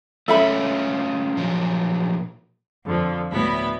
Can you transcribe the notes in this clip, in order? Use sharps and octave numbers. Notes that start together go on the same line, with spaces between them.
A3 C#4 F4 A4 E5 B5
A#2 F3 F#3
F2 D3 F3
D2 A2 B3 E4 B5